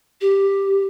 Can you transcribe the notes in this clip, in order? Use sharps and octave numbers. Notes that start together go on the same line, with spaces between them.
G4